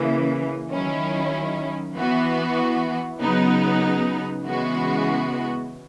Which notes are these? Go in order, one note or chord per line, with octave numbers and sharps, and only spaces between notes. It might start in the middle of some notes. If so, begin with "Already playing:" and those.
Already playing: C#3 E3 A#3
D#3 F#3 C#4 E4
E3 B3 F#4
C#3 F#3 B3 D#4
C#3 E3 G#3 B3 F#4